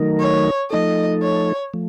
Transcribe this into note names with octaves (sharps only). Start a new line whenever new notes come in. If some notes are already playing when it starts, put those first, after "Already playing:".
Already playing: D#3 F#3 A3 D#4 A#4
C#5
F3 A3 D#4 A4 D#5
C#5
F3 A3